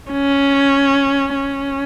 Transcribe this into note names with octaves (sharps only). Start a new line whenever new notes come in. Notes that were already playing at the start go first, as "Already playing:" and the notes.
C#4
C#4